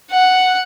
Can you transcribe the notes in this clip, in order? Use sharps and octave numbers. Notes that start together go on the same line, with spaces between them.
F#5